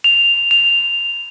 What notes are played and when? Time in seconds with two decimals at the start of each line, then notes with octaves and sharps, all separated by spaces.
0.04 F7
0.51 F7